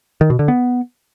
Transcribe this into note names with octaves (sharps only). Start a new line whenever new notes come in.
D#3
B2
D3
B3